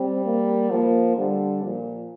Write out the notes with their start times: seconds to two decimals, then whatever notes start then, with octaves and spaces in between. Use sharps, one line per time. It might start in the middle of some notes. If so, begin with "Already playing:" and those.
Already playing: G3 C4
0.25 A#3
0.71 F3 A#3
1.17 D3 G3
1.64 A#2 F3